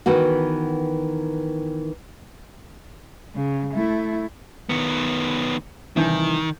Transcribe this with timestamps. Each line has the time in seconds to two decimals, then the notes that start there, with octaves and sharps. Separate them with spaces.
0.06 D#3 E3 B3 F#4
3.35 C#3
3.74 A3 E4
4.69 D#3 B3 C#7
5.96 C2 D#3 E3 G6